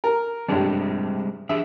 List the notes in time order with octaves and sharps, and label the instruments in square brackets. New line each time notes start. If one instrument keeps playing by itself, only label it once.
[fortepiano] A#4
[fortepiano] A1 G2 [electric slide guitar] G3 G#3 C4
[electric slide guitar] E3 D4 G#4 [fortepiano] E5